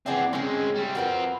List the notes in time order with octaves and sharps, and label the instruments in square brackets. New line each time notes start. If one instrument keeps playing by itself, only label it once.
[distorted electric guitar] E3 C4 [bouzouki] G#4 D5 F#5
[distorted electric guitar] G#3 C4 [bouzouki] C#4 G#4
[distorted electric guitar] G3 C4
[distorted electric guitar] C4 F4 [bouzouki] F#4 A#4 B4